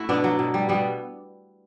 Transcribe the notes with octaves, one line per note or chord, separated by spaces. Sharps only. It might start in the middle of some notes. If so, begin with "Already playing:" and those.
Already playing: A3 E4 F#4
B2 B3 D4
F#3
B2
G3
B2 G3 B3